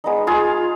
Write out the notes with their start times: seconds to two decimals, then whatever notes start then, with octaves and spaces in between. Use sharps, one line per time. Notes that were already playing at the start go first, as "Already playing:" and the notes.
0.04 G#3 B3 D#4
0.27 F4 G#4